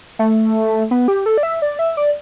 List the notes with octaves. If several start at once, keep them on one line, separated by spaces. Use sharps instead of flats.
A3
B3
G4
A4
D5
E5
D5
E5
D5